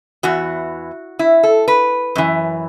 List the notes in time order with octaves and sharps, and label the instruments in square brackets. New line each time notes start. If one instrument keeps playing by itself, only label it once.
[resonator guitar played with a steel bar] E2 E3 F#4
E4
A4
B4
F#2 E3